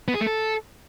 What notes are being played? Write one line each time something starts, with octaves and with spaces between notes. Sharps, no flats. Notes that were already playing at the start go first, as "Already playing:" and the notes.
B3
G#4
A3
A4